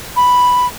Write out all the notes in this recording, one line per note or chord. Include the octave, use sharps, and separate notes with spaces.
B5